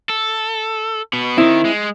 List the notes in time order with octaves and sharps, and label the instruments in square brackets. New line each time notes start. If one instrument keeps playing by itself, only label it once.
[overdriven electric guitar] A4
B2 B3
[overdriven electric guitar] D#3 [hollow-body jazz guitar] C4 E4
[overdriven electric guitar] G#3